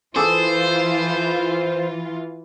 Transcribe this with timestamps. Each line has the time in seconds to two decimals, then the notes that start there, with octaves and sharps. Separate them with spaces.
0.16 E3 F4 G#4 A4 C5 D6